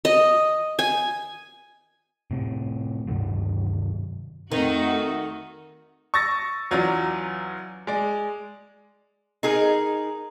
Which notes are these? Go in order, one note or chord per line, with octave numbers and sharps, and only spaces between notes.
D#5
G#5
A2 C3
G2 C3 D#3 F#3
F2 D#3 A3 D#4 F#4
C#6 E6 A6 A#6
E2 F#3 C#4 F4 D5 A#5
G#3 D5
D#4 G#4 A#4